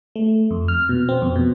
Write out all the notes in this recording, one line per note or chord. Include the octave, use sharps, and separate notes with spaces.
A3
F2
F6
B2
C4
F2
B2